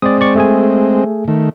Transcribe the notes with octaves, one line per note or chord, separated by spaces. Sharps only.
G#3 C4 D5 D#6
D5 C#6
A3 G#4 G#5
D#3 A3